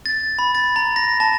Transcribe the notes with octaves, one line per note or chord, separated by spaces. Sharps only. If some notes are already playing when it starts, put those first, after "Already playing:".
A6
B5
A6
A#5
A#6
A5